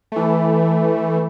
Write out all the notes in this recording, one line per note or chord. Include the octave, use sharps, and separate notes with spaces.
E3 A3